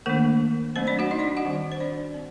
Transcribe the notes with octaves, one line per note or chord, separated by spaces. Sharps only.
D#3 A3 A#3 D4 A#4
F#3 A3 C4 D4 C5
D4 D5
F#4 F#5
D#4 D#5
D4 D5
F#4 F#5
D#3 G3 C4
C5
D4 D5
C4